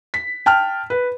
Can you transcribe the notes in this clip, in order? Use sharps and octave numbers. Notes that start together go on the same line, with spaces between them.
B6
G5 A5 F6
B4